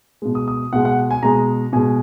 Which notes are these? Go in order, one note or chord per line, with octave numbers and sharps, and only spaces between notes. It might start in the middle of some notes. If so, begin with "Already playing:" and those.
B2 G#3
D#6
D#6
B2 G#3 F#5
F#5
G#5
B2 G#3 A#5
B2 G#3 G#5